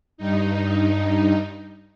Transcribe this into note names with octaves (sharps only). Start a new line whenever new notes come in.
G2 D#4